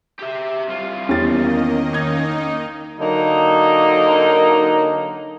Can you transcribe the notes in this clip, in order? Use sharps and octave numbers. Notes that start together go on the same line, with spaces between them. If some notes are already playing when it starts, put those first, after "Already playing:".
G4 E5
C2 F4
E2 D#3 A#3 C#4 G4 D#5 A6
D#4 G#6
D3 F#3 A#3 D#4